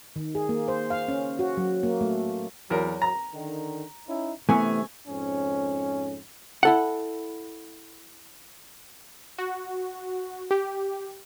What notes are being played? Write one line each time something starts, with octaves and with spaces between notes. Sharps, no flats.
D#3
G#4
A#3
C5
F5
C#4
F#4
F#3
A#3
A3
E2 F#3 A#4
A#5
D3 D#3
C#4 D#4 E4
C3 E3 A3 B3 C#4 G#5
F2 G#2 C#4
E4 A4 F#5
F#4
G4